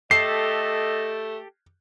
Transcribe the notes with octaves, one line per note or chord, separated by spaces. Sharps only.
A3 G4 A4 D#5 C7